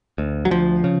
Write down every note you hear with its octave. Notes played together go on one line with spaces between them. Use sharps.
D2
F#3
D2 F3
C#3